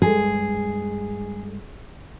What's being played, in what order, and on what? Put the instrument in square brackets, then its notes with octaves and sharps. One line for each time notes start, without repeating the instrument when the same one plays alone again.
[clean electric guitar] G2 G#3 [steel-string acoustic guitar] G#4